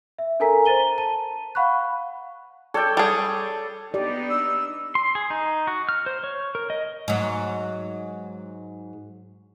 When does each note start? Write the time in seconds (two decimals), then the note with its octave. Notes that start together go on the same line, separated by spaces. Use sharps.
0.19 E5
0.40 D4 A4 A#4 G#5 A#5 B6
0.65 C5 A#5 A6 D#7 G7
0.98 A5 D#7
1.55 F5 F#5 B5 C#6 F#6
2.74 A4 C#5 D5 G5
2.97 G3 G#4 A5
3.94 B3 D4 D#4 G4 D5
4.30 E6
4.95 C6
5.15 G#4
5.30 D#4
5.67 F#4
5.89 F6
6.06 C5
6.24 C#5
6.55 A#4
6.70 D#5
7.08 G#2 F#3